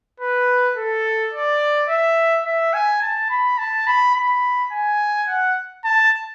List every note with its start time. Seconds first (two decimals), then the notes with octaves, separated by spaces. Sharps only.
0.20 B4
0.77 A4
1.33 D5
1.89 E5
2.46 E5
2.74 G#5
3.02 A5
3.30 B5
3.58 A5
3.87 B5
4.15 B5
4.72 G#5
5.28 F#5
5.84 A5